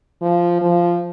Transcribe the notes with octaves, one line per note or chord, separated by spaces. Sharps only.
F3
F3